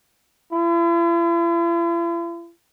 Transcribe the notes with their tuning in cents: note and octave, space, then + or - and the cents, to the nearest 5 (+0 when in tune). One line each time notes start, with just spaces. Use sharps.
E4 +45